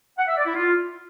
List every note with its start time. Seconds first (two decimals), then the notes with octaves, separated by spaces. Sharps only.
0.18 F#5
0.28 E5
0.37 D5
0.46 E4
0.55 F4